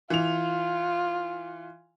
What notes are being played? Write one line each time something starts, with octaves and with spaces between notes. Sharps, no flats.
E3 F4 F7